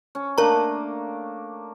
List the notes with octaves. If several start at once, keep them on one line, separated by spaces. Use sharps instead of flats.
C#4
A3 A#3 D4 A#4 A#5